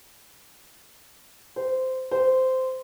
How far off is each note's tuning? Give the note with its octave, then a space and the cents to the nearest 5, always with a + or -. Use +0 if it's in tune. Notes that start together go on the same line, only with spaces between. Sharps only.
C5 -15
C5 -15